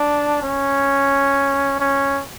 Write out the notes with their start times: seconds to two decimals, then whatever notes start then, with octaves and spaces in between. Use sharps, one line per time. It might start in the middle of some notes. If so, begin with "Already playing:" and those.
Already playing: D4
0.42 C#4
1.80 C#4